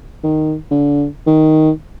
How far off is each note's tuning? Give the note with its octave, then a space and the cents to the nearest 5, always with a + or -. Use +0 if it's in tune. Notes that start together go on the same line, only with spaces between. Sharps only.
D#3 -5
D3 -30
D#3 +5